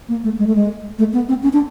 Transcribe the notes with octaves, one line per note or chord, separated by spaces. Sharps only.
A#3
A3
G#3
A3
G#3
A3
B3
C4
C#4
D4